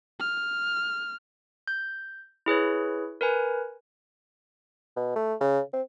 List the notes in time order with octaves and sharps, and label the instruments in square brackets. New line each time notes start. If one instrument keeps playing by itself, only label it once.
[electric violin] F6
[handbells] G6
E4 G#4 B4 C#5
A#4 B4 G#5
[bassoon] B2
A3
C#3
C4